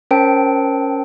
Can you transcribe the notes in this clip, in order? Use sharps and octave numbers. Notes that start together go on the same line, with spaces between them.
C#4 A#4 C5 G5 A5 D7